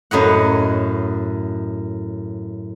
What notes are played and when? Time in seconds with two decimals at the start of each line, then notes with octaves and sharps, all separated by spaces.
0.11 F#2 A2 D#5 F#5